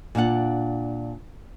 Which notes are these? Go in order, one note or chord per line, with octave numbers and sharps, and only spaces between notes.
A#2 D4 F5 F#5